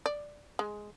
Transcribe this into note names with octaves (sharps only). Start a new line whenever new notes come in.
D5
G#3